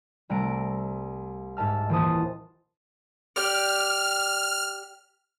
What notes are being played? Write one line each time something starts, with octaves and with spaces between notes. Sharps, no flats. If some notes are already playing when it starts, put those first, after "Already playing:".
C2 C3 A3 A#5 D7
G#2 E5 A5 F6
D#1 E3 C5 A5 D#6
G4 D5 F6